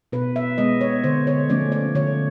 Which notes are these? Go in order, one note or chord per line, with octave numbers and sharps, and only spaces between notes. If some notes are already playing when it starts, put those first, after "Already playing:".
B2 B4
E5
G#3 B3 D#5
C#5
D3 C5
C#5
F3 A3 C#4 D5
D5
D3 C#5